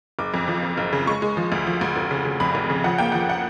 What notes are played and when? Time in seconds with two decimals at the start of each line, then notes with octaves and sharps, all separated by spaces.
0.19 F#1 D6
0.34 F2
0.48 F3
0.63 F#1
0.77 F#1
0.93 C#3
1.07 G#3 C#6
1.22 G#3
1.37 F3
1.52 D2
1.67 F3
1.81 D2
1.96 F1
2.11 C#3
2.25 C#3
2.40 F2 B5
2.55 F1
2.70 C#3
2.84 F3 F#5
2.98 A#3 G5
3.12 F3 F#5
3.29 F#5